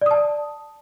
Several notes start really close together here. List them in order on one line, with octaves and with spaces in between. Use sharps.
D5 D#6 A5